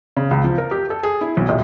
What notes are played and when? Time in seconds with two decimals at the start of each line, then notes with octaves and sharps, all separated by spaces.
0.17 C#3
0.31 C#2
0.44 F3
0.58 A#4
0.71 G4
0.90 A4
1.03 G#4
1.21 E4
1.37 B1
1.49 D#1